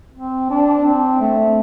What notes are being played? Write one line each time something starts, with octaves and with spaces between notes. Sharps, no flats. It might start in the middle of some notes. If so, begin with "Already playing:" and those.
C4
D4
C4
A3